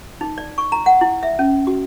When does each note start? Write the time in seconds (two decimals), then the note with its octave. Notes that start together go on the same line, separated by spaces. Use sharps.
0.21 D#4
0.38 D5
0.58 C#6
0.72 A#5
0.86 F#5
1.01 E4
1.23 E5
1.39 C#4
1.67 F#4